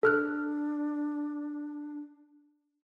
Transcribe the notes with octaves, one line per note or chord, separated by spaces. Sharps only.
D4 A4 F6 F#6